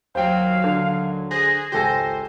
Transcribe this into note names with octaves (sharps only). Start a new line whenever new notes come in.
D#2 F#3 C5 F5 G5
D3
G#4 C5 F#6 A#6
G#1 C#2 G4 A4 C5 G#5